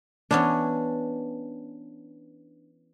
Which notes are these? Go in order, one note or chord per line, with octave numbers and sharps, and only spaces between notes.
E3 B3 C#4 D4